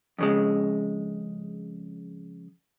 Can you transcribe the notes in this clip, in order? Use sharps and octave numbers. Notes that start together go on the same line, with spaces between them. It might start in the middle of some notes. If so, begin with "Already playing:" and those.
F2 C#3 G#3